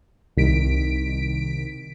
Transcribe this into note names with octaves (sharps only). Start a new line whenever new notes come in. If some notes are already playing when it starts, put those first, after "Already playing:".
C2 D#3 B6 D7